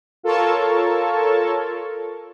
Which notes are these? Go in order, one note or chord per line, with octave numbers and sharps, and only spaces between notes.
F4 A4 A#4 C#5 A5 C#6